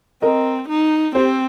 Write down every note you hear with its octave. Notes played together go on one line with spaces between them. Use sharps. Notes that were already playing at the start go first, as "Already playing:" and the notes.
C4 A#4 D#5
D#4
C4 G4 C5